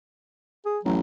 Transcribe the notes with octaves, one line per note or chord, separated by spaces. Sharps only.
G#4
A1 F#3